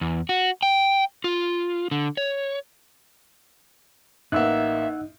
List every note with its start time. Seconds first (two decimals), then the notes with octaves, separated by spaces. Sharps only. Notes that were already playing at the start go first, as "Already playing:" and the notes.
0.01 E2
0.29 F#4
0.63 G5
1.24 F4
1.91 D3
2.17 C#5
4.32 A1 A#3 D#4 E5 F#5 E6 F#6